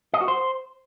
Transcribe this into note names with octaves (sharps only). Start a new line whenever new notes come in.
D#5
F#4
C5